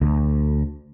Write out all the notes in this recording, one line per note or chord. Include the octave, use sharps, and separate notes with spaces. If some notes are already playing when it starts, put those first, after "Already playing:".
D2